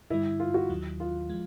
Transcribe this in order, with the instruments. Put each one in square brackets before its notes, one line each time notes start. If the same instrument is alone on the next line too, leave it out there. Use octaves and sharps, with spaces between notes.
[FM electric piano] G2 D3 G3 [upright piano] E4
[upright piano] F4
F#4
[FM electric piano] D#2 D#3 F#3
[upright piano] F4
[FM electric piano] F3 G#3